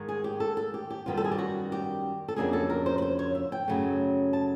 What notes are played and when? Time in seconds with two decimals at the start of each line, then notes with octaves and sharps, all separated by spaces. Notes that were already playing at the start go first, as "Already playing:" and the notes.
Already playing: G#2 D#3 G#3
0.09 G#4
0.24 G4
0.40 A4
0.57 A4
0.74 G4
0.90 G4
1.06 F#2 D#3 G3 B3 F4
1.17 A4
1.24 G#4
1.31 G4
1.38 F#4
1.72 G4
2.28 A4
2.36 F2 C#3 F#3 A#3 D4 G#4
2.53 A4
2.70 A#4
2.86 C5
2.98 B4
3.02 C5
3.19 C#5
3.35 E5
3.52 G5
3.68 F#2 C#3 F#3 A3
4.33 A5